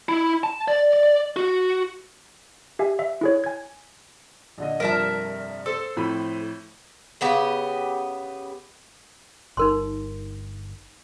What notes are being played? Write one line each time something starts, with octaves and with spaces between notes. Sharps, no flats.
E4
A5
D5
F#4
G4 E5 G#5
E5
E4 G#4 C#5
G#5 G#6
A#1 D3 D#5
F1 G2 F3 A#4 E5 A5
A4 C5
F2 A2 B5
C#3 B3 G4
G1 D#4 A#4 C6